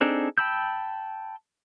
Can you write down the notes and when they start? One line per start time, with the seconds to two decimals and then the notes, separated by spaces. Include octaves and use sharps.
0.01 C4 D4 D#4 G#4 A4
0.38 G5 A5 B5 E6 G6